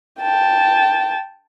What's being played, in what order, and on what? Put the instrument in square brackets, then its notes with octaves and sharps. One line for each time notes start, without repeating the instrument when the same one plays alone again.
[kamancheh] G5 A5